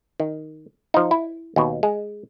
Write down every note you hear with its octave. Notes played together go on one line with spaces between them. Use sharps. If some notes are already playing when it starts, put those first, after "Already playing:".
D#3
F3 D#4
E4
D#2 B2
G#3